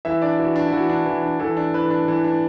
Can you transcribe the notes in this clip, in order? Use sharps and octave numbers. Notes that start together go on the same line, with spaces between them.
E3 E5
D4 D5
E3 F#4
D4
E4
E3 F#4
D4
E3
D4
E3 A4
D4
E3 B4
D4
E3
D4